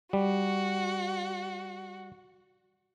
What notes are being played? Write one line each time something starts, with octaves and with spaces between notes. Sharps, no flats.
G3 F#4